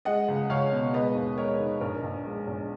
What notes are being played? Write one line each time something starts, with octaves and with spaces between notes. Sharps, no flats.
G#3 D#5 F#5
C#2
C#2 C#5 F5
B2
G#3 B4 D#5
D#2
G#3 A#4 C#5
D#3
A#1 A#4
A#1
G#3
A#1